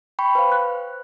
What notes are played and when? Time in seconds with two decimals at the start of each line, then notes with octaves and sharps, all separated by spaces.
0.19 G5 B5 C#6
0.35 B4 C5 F5
0.52 F#6